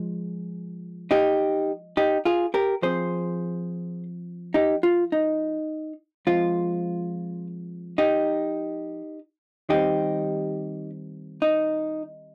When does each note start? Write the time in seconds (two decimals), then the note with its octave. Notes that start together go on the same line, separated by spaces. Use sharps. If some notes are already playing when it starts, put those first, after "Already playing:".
Already playing: F3 G#3
1.11 D#4 G4
1.97 D#4 G4
2.25 F4 G#4
2.54 G4 A#4
2.82 F3 C4 G#4 C5
4.54 D#4 G4
4.83 F4
5.12 D#4
6.27 F3 G#3 C4 F4
7.98 D#4 G4
9.69 D#3 G3 C4 D#4 G4
11.42 D#4